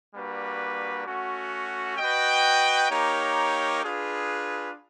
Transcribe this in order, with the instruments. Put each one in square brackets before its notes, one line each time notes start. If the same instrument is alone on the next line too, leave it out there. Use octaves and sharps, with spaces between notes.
[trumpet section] G3 A#3 D4 F#4 B4
A3 C#4 F#4
F#4 B4 D#5 G5
A#3 D#4 G4 A#4 C#5
D4 F4 G#4 B4